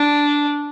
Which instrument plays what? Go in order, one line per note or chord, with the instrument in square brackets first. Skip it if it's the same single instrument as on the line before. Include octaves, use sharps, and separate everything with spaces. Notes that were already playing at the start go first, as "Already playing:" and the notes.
Already playing: [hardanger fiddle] D4